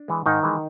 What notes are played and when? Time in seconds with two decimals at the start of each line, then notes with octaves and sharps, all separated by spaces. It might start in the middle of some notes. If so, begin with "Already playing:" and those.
Already playing: D4
0.08 E3 G#3
0.26 G#2 D#3 D#4
0.43 E3 G#3